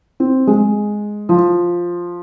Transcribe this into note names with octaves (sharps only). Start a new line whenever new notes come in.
C4
G#3
F3